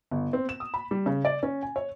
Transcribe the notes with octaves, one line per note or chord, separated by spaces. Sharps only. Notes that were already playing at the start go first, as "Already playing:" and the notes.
G1
C4
E7
D#6
B5
G3
C#3
D5
C#4
G#5
C#5